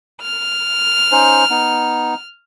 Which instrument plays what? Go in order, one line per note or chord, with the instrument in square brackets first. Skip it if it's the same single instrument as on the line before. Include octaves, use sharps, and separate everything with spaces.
[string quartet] F6
[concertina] C#4 D#4 C5
B3 D#4